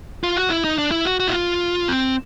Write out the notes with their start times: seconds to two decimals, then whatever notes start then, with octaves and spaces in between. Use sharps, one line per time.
0.24 F4
0.37 F#4
0.50 E4
0.64 D#4
0.78 D4
0.91 E4
1.05 F#4
1.20 F#4
1.28 E4
1.33 F4
1.88 C4